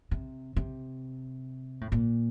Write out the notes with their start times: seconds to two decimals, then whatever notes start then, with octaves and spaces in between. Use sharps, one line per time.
0.11 C3
0.56 C3
1.81 A2
1.92 A#2